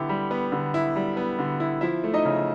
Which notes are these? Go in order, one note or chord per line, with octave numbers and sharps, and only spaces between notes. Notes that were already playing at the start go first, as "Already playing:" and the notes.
Already playing: D3 B3 E4 G4
G3
B3
D3
E4
G3
B3
D3
E4
F3 E4 E5
A3
D#4 D#5
C#3